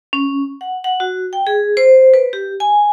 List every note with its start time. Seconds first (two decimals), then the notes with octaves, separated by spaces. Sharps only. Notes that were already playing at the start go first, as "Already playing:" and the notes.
0.13 C#4
0.61 F#5
0.84 F#5
1.00 F#4
1.33 G5
1.47 G#4
1.77 C5
2.14 B4
2.33 G4
2.60 G#5